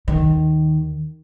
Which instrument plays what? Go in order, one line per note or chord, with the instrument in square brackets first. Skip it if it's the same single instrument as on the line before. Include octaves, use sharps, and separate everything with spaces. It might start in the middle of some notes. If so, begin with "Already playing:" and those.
[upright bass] D#2 D#3